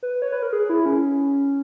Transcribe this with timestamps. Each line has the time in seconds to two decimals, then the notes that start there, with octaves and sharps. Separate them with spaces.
0.03 B4
0.22 C#5
0.32 B4
0.43 A#4
0.53 G#4
0.70 E4
0.86 C#4